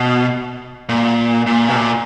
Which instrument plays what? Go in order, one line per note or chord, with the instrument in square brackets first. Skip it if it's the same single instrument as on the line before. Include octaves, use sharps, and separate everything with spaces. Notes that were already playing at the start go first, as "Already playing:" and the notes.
Already playing: [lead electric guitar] B2
A#2
A#2
B2
A#2